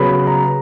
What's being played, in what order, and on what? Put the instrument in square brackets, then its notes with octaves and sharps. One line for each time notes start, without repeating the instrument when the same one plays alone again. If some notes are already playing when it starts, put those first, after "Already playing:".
Already playing: [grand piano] C#3 F#3 B3 B5
A#5